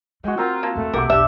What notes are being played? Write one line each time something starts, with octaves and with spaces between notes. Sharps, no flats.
G#3 A3 F#4 G5
C4 F4 A#4
A#3 A5
E2 A2 A3
B1 A#3 G4 A#4 F#5 C#6
B1 E2 D4 G4 E5